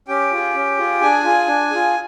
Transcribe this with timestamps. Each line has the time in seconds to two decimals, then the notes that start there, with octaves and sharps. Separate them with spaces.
0.08 C#4 G4 G5
0.32 F4 G#4
0.55 C#4
0.78 F4 G#4
1.01 D4 G#4 G#5
1.24 F4 G#4
1.48 D4
1.71 F4 G#4